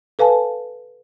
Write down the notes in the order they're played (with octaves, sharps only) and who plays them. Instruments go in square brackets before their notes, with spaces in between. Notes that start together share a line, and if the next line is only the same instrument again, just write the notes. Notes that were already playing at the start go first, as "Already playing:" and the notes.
[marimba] A4 B4 F5 G#5 A5